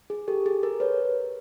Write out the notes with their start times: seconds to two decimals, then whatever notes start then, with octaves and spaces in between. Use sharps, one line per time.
0.10 G#4
0.28 G4 A4
0.46 G#4
0.63 G#4 A#4
0.80 B4 C#5